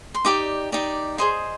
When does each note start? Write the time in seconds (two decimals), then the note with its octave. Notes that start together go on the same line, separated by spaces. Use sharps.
0.14 C6
0.25 D#4 G4 D5 D6
0.72 D#4 G4 D5
1.18 G#4 C5 D#5 C6